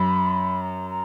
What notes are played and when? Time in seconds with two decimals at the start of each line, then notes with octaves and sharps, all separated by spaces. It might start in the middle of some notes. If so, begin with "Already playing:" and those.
Already playing: F#2 B5
0.61 A#5
0.90 A#5